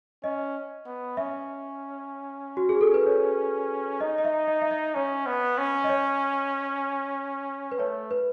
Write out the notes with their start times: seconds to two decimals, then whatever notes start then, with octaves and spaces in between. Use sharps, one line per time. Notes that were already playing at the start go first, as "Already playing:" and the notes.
0.24 C#4 D#5
0.86 B3
1.17 C#4 E5
2.57 F#4
2.69 G#4
2.81 A4
2.94 B4
3.06 C#5
4.00 D#4 D#5
4.18 D#5
4.25 E5
4.48 D#5
4.62 E5
4.71 D#5
4.95 C#4 C#5
5.26 B3
5.58 C#4
5.84 D#5
5.89 C#5
7.72 B4
7.79 A3 C#5
8.11 B4